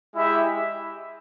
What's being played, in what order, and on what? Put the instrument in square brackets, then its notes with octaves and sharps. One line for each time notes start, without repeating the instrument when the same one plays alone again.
[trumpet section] G#3 E4 G4 E5